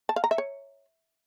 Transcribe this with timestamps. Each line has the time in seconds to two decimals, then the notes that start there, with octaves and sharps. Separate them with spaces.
0.09 A5
0.16 F5
0.24 A#5
0.31 E5
0.38 C#5